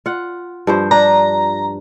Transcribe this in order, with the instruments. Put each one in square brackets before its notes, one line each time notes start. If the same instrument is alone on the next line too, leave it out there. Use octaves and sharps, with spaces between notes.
[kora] F4 F#5
G2 F3 C5
[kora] D4 [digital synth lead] A#5